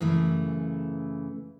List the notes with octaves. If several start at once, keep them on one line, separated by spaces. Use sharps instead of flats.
F#2 C#3 E3 A3